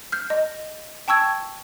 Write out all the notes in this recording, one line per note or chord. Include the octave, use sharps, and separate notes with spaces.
F6 G6
D#5
G5 A5 C#6 E6 G#6